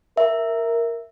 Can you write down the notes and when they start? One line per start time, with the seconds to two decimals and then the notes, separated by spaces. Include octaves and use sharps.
0.17 A#4 E5